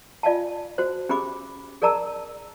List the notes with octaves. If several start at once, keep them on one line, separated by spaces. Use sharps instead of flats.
F4 D5 F5 G#5 A5
F#4 C5
C#4 G4 G#4 B5 D6
G#4 A#4 D5 A5 A#5 E6